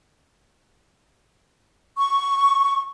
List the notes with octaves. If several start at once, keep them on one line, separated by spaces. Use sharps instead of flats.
C#6